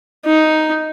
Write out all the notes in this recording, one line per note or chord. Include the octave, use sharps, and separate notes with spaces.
D#4